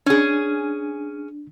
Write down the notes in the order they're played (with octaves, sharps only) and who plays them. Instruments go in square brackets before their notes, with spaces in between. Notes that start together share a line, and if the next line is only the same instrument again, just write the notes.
[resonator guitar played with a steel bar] C#4 G#4 [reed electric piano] D4